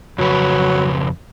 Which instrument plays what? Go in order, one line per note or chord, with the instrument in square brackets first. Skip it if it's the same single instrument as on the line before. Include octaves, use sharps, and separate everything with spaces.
[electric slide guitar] F2 C#3 B4 [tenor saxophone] F#3